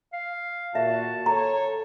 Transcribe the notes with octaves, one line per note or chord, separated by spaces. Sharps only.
F5
A#2 F#4 E5 A5
A4 C#5 A#5